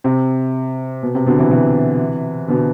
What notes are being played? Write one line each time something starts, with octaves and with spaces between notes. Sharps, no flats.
C3
B2
C3
B2 D3
C3 E3
C3 E3
B2 D3